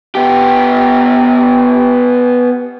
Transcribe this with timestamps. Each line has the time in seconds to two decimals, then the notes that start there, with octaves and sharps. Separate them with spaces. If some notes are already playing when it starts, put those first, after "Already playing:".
0.15 B3 G4